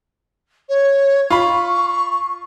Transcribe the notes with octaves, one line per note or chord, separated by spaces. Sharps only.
C#5
F4 B5 C#6